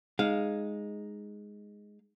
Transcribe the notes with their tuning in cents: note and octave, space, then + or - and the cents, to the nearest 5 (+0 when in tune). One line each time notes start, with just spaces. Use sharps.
G#3 +0 D#4 +0 F5 +0